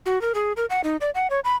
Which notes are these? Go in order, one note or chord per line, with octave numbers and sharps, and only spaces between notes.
F#4
A#4
G#4
A#4
F#5
D#4
D5
F#5
C#5
B5